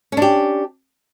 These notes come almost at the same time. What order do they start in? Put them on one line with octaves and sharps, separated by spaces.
C#4 D4 G4